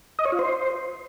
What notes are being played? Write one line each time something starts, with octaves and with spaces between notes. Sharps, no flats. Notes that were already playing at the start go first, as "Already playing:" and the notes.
D#5
C#5
F4
C5